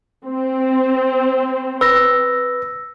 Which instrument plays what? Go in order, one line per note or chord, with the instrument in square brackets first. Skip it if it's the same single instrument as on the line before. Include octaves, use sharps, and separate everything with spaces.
[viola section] C4
[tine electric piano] B4 [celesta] E6 A#6